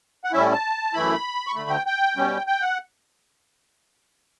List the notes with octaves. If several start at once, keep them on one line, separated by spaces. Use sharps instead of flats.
F#5
A2 G3 C#4 E4 E5
A5
F#2 E3 A3 E4 B5
C#6
D2 D3 A3 B5
G5
G5
B2 G3 C#4
G5
F#5